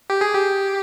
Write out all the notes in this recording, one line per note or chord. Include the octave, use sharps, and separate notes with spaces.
G4
G#4
G4